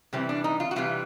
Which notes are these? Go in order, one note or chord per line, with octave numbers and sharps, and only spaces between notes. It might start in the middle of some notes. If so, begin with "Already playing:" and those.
C3 E3 G3 C4
D4
D#4
F4
F#4
C3 E3 G3 F4